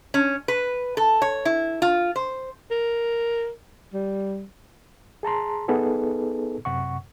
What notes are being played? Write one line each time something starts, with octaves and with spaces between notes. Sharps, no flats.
C#4
B4
A4
C#5
E4
F4
C5
A#4
G3
G#4 A5 A#5 C6
B3 D#4 G#4 A4 B4
F#2 C3 F#5 C#6